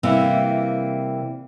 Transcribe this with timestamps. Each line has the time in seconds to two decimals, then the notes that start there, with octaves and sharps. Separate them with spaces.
0.03 C3 E3 G3 A#3